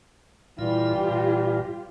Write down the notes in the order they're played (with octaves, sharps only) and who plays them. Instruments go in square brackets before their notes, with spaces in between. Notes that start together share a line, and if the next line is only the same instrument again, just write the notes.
[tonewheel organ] A#2 E4 [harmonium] E3 G3 [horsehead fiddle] F4 G4
[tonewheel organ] A#2